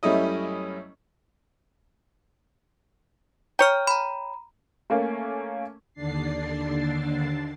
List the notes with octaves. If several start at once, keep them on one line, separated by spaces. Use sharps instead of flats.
F#2 G3 A3 C#4 E4 D#5
C#5 G5 A#5 F6
A#5 B5
A3 A#3 C#4
D#2 D3 D4 A6 C7